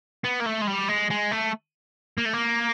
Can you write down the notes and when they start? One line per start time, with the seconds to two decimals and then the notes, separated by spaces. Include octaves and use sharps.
0.25 B3
0.41 A#3
0.46 A3
0.62 G#3
0.68 G3
0.89 G#3
1.11 G#3
1.32 A3
2.18 A#3
2.25 A3
2.33 A#3